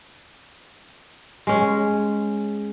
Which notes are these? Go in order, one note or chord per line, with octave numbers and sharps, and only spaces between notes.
G#3 C#4